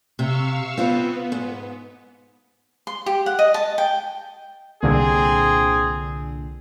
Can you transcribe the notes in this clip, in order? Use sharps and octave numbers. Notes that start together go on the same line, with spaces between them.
C3 F5 C#6 E6
B3 C4 F4 B4
G#2
C6
G4
F#5
D#5
A5
G5
C2 A#2 D3 C4 G#4